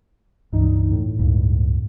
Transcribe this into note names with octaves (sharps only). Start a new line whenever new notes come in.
C#2 G2 E3 D#4
A2
C#2 G2